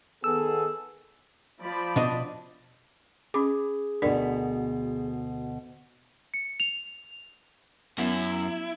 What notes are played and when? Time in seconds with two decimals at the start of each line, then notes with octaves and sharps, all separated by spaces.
0.24 D#3 B3 G#4 A4 E6
1.62 F3 D5 B5
1.96 B2 D4 D#5
3.34 C#4 G#4 D6
4.02 D2 B2 D4 A#4 D5
6.34 C#7
6.60 F7
7.98 F#2 B3 E4 F#4